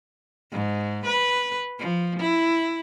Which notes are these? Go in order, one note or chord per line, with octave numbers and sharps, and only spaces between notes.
G#2
B4
F3
E4